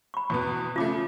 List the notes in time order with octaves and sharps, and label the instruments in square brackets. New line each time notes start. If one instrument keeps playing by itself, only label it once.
[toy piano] B5 C#6
[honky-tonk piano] E2 B2 B3 [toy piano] C#6
[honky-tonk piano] C#3 F3 A3 [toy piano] F4 D6